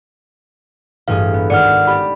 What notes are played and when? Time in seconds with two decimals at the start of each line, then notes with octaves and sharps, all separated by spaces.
1.08 A1 G2 G#4 F5
1.34 B3
1.50 G#1 D5 F#5 F6 C#7
1.87 G4 D5 B5